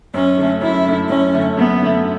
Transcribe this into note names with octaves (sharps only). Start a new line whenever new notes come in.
F#2 C#4
D3 A3
F#2 E4
D3 A3
F#2 C#4
D3 A3
F#2 B3
D3 A3